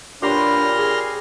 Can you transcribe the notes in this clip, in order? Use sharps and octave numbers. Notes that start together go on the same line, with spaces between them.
A#2 D4 G4 B4 C#5 C6 F6 A#6
G#4